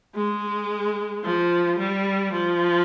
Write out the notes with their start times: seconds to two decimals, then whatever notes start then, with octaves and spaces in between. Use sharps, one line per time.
0.15 G#3
1.24 F3
1.78 G3
2.33 F3